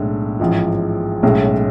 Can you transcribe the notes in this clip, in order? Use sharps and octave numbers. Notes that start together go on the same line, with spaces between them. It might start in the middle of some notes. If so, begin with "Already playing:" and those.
Already playing: B1 A2 G#3 D4
A1 G#2 F3
B1 A2 G#3 C#4